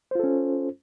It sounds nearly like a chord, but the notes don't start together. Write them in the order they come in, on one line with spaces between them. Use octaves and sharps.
C5 F4 A4 C#4